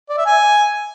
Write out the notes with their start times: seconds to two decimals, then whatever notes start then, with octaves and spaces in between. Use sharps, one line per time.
0.09 D5
0.17 E5
0.26 G#5